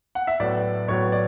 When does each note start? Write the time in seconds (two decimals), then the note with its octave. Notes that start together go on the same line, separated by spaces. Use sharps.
0.15 F#5
0.27 E5
0.40 A2 F#3 B3 D5
0.88 A2 F#3 B3 C#5
1.12 D5